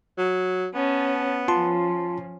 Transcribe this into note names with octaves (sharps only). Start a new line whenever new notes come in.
F#3
B3 C#4 A5
F3 C#4 F4 A5 C6